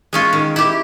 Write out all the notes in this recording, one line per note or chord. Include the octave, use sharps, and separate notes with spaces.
G#3 C#4 F4
D#3
E4 G4